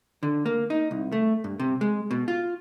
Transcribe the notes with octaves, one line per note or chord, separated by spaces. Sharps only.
D3
A#3
D#4
C2
A3
G2
C3
G#3
B2
F4